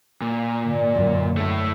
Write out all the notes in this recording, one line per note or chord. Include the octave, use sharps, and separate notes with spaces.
A#2
G#2 D3
C#2 F#2
A3 E4